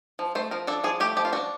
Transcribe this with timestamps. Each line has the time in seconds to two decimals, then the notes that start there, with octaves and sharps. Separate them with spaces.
0.19 F3
0.35 A3 C5
0.51 F3 A#4
0.67 D4 A4
0.84 F3 G#4
1.00 A3 G4
1.17 F3 G4
1.25 F4
1.33 D4 F#4